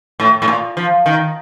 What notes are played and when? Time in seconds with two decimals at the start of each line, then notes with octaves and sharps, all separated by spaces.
0.20 A2
0.42 A2
0.48 A#2
0.77 F3
1.06 D#3